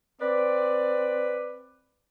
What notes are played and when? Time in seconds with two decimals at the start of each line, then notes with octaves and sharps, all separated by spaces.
0.22 C4 B4 D5